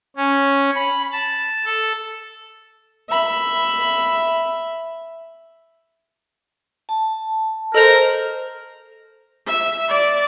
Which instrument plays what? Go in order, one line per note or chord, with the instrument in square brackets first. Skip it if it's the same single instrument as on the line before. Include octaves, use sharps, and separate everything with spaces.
[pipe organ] C#4
B5
A5
A4
[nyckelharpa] E5 B5
[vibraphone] A5
[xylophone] A4 F7 [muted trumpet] A#4 [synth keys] C5 D#5
[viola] E5
D5